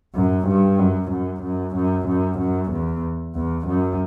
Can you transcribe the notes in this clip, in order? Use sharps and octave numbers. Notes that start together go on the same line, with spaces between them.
F#2
G2
F#2
F#2
F#2
F#2
F#2
F#2
E2
E2
F#2